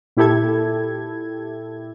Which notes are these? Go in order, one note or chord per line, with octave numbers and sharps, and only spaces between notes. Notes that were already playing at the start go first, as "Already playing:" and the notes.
A#2 E4 G4 A4 G#6